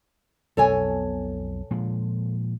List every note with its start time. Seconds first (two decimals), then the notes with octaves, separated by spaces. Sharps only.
0.57 B1 F2 B2 A4 C#5 G#5
1.71 A#2 F3 G#3